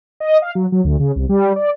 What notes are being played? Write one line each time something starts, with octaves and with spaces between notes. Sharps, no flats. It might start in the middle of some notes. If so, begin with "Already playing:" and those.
D#5
F5
F#3
F#3
D2
C#3
C2
G3
D5